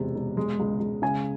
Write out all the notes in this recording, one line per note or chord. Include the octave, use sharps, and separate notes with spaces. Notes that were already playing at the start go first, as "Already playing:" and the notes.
Already playing: E1 C3
E1
G#3
C#2
C#2
C#3 G#5